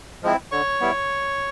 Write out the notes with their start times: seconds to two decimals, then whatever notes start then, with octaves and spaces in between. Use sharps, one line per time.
0.23 F3 G#3 C4 E4
0.52 D3 C#5 C#6
0.81 G3 B3 E4